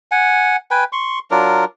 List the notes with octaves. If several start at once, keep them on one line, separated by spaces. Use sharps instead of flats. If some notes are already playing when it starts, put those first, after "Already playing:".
F#5 G#5
B4 G5 G#5
C6 C#6
F#3 D4 F4 A#4